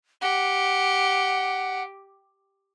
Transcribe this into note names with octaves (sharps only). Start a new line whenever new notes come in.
G4 F#5